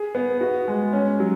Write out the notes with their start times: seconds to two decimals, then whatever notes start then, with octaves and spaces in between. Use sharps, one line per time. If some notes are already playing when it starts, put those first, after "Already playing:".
Already playing: G#4
0.15 B3
0.41 F#4
0.68 G#3
0.93 C#4
1.20 F#3